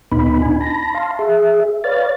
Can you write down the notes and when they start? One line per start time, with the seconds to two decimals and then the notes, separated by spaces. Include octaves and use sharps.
0.12 D2 A#2 B3 D#4 B5
0.42 D4 D#4 G#5
0.61 A5 B5 A#6
0.94 F5 A5 C6
1.19 G#4 E5
1.84 B4 C#5 D5 F5 A6